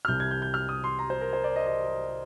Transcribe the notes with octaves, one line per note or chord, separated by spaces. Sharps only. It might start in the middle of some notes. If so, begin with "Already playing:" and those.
F6
C2 C3 G3 G6
G#6
G6
G6
F6
D#6
C6
A#5
C5
A#4
C5
D5
D#5
D#5